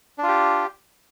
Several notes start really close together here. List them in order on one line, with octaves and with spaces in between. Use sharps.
D4 F4 G4